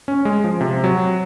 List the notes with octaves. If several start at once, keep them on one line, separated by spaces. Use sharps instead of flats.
C#4
G#3
F3
C3
F#3